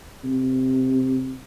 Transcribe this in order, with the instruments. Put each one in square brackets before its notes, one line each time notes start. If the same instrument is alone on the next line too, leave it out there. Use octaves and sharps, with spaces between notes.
[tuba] C3